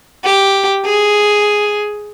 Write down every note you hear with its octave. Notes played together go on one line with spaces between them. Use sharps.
G4
G#4